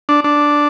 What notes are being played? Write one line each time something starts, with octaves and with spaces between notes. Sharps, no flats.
D4
D4